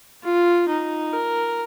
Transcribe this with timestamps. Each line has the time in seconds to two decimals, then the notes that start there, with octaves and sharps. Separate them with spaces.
0.23 F4
0.68 D#4
1.13 A#4